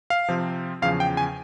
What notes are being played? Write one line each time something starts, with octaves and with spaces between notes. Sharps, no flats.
F5
C3 F3 C4 F4
E2 C#3 F3 F5
G5
G#5